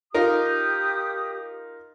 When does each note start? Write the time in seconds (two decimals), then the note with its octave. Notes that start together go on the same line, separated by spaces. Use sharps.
0.14 D#4 F4 G4 A#4 D#6